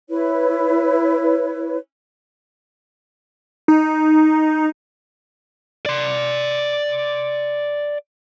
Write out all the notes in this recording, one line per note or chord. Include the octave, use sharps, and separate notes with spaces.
E4 B4 C#5
D#4
D5 C6